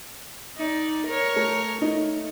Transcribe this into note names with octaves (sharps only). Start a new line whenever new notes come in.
D#4 D5
A#4 C#5
A3
A3 D#4